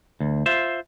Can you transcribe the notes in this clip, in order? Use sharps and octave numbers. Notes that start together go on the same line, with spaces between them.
D2
F4 C5 E5